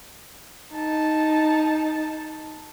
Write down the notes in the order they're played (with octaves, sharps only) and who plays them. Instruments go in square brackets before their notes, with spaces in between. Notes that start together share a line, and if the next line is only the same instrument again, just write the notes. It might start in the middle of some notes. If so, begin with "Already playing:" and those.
[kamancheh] D#4 A5